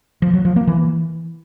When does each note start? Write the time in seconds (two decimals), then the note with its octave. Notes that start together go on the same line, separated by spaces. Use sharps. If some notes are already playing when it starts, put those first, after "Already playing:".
0.22 F3
0.34 F#3
0.45 F3
0.56 A#3
0.68 E3